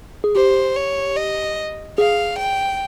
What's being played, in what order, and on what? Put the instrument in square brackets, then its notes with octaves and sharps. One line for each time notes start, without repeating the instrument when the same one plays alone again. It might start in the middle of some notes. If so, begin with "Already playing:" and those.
[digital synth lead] G#4
[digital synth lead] G4 [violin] C5
[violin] C#5
D#5
[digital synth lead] G#4 [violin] F5
[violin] G5